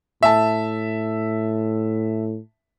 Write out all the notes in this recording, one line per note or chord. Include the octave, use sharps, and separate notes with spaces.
A2 E5 A5